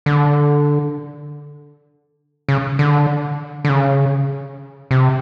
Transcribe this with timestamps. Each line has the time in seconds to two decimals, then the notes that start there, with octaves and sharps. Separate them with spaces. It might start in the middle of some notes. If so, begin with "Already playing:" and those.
0.06 D3
2.49 C#3
2.79 D3
3.65 D3
3.69 C#3
4.91 C3